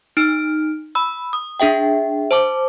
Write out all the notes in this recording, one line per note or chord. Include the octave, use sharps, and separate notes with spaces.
D#4 F6 D7
B5 E6
D#6
D4 G#4 E5 G5
C5 A5 D6